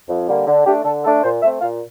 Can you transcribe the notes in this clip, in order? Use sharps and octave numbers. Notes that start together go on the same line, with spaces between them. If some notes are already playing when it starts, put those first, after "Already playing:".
F2
D3 G3 A#3
D3
A3 D4 G4
D3 A4
A3 D4 A4
A#2 C5
A3 C4 E5
A#2 F5